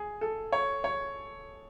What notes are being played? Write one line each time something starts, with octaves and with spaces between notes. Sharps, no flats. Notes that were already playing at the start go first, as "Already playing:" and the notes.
Already playing: G#4
A4
C#5
C#5